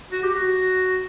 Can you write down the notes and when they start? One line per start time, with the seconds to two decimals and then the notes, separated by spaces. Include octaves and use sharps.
0.12 F#4
0.23 G4
0.34 F#4